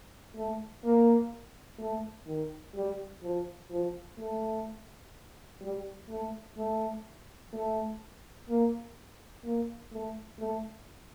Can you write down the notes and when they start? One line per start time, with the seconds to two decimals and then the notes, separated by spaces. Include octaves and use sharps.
0.36 A3
0.84 A#3
1.79 A3
2.27 D#3
2.75 G3
3.23 F3
3.71 F3
4.18 A3
5.61 G3
6.09 A3
6.57 A3
7.53 A3
8.49 A#3
9.44 A#3
9.92 A3
10.40 A3